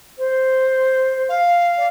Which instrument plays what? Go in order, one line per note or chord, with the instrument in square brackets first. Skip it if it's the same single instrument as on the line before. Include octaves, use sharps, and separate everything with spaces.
[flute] C5
[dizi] F5
[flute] D5